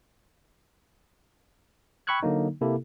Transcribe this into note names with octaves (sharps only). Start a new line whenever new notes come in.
G5 B5 C#6 E6 F#6 G#6
D3 F#3 A#3 D#4
C3 A#3 E4 G4 A4